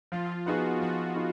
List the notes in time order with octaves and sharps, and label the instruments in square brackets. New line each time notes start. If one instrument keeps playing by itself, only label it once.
[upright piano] F3 [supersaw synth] F4
[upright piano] B3 D#4 G#4 B4 [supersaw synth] F#4
[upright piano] F3 [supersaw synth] F#4
[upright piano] B3 D#4 G#4 B4